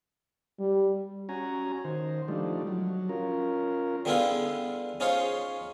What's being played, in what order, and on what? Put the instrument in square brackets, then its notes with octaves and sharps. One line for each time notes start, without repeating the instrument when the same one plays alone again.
[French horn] G3
[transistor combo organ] C#4 F#4 G#5 A#5
D#3 C5
F3 G3 A3 D4 D#4
F#3
C#4 F4 A#4
[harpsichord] D3 G3 B3 E4 F4 G#4
C#4 D#4 F4 G#4 C5 C#5